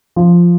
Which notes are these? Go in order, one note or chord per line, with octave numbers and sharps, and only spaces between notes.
F3